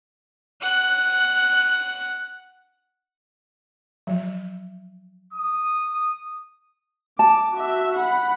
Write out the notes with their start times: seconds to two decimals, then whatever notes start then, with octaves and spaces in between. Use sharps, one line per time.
0.61 F#5 F#6
4.07 F3 F#3
5.34 D#6
7.19 A5 D6
7.54 F#4 E5
7.94 F#5 B5